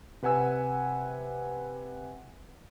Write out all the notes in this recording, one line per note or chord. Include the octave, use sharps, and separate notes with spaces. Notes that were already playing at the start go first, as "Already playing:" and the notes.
C3 B4 F#5 G#5 E6